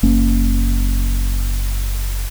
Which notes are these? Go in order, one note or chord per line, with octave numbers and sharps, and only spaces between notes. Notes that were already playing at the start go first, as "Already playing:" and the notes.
F#1 A#3 C#4